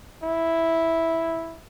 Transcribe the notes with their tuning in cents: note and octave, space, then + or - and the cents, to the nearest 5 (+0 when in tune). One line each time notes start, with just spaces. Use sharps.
E4 -5